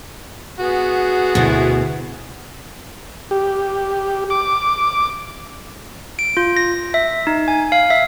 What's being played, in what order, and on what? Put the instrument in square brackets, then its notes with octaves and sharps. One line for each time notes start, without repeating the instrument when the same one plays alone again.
[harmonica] B3 G#4 [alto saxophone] F#4
[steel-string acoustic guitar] D2 B2 E4
[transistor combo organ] G4
D6
[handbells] D7
F4
A#6
E5
D#4
G#5
F5
E5